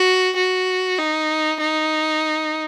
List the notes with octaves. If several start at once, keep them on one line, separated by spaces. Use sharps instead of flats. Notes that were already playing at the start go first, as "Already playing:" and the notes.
Already playing: F#4
F#4
D#4
D#4